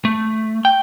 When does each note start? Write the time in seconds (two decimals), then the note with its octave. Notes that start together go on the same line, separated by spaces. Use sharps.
0.05 A3
0.65 G5